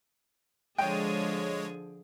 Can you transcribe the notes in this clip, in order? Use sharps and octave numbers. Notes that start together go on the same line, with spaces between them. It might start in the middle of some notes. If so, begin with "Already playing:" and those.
D3 F3 G#3 G#4 C#5 G5